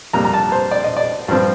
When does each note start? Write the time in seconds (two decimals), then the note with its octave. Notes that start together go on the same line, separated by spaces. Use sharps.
0.13 F2 C3 G3 A#3 A#5
0.25 A#5
0.33 A5
0.52 C5
0.71 D5
0.84 D#5
0.97 D5
1.28 G2 F3 C4